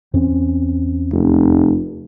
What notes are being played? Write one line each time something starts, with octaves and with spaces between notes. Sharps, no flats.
E2 C4 C#4
F1